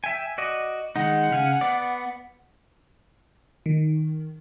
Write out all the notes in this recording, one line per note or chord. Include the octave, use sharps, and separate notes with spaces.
E5 G5 G#5
F#4 D5 D#5
D#3 G#3 D#4 F#5
C#3 F5 G#5
B3 D5
D#3